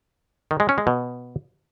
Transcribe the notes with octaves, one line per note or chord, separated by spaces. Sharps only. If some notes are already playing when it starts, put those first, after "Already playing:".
D#3
G#3
C#4
G#3
B2